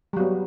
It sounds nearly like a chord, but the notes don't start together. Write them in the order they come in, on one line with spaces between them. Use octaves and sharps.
G3 F#3 B3